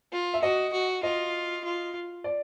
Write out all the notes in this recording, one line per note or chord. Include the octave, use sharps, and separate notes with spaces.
F4
E5
F#4 D#5
F#4
F4 D#5
F4
D5